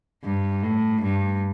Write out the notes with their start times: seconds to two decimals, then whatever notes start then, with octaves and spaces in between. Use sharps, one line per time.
0.24 G2
0.63 A2
1.02 G2